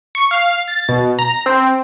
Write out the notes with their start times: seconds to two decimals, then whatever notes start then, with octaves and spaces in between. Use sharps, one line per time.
0.15 C#6
0.31 F5
0.68 A6
0.89 B2
1.19 A#5
1.46 C4